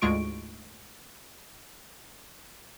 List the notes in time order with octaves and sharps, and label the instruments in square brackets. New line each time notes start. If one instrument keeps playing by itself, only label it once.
[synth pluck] D2 G#2 G#3 F4 C#6 D7